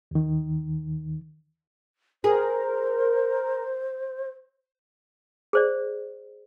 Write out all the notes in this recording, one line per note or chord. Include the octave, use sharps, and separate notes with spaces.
D#2 D#3
G#4 A#4 C5
G#4 C5 D5